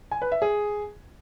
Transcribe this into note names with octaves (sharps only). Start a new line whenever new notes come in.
G#5
B4
E5
G#4